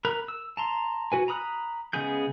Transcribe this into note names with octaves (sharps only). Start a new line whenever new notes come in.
A#4 B5 F#6
E6
A5 A#5 C6
F#4 B4 G#5
A#5 B5 D#6 F6 F#6
C#3 G#3 B3 G#4 G6